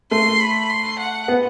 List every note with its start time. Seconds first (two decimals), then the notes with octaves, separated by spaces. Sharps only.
0.11 A3 C6
0.40 B5
0.70 C6
1.00 F#5
1.28 B3